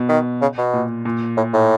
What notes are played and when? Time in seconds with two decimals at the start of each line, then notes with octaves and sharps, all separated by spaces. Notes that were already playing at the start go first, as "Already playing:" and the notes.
Already playing: B2
0.09 D#3
0.41 C#3
0.58 B2
0.74 A#2
1.05 A#2
1.37 A2
1.53 A2